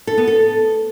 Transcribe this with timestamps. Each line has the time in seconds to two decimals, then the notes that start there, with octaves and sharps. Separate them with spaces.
0.07 A4
0.17 B3
0.28 A4